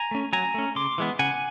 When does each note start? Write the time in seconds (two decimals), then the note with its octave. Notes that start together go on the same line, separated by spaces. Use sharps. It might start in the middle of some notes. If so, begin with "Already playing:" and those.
Already playing: G#5 A#5
0.11 A3 C#4
0.33 F#3 G#5 A#5
0.54 A3 C#4
0.75 C#3 C6 D6
0.98 E3 G#3 B3
1.19 C#3 F#5 G#5